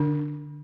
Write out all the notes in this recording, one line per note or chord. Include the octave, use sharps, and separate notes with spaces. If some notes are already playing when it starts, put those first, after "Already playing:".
Already playing: D3 D4